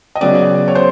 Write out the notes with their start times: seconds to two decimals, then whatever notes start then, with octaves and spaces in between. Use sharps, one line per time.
0.15 D#5
0.21 C#3 F#3 B3 D5
0.68 C#5
0.75 C5